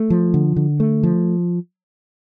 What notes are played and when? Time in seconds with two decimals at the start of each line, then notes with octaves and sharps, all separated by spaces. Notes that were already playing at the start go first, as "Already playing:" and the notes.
Already playing: A3
0.10 F3
0.34 D3
0.56 D3
0.80 A3
1.03 F3